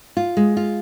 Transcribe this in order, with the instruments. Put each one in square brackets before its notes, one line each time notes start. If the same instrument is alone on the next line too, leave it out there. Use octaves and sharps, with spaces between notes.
[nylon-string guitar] F4
G#3
F4